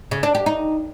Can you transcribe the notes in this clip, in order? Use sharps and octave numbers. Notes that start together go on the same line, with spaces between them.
C#3
D4
G4
D#4